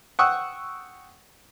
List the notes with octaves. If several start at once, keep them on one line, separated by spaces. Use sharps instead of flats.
F#5 G5 C#6 D#6 E6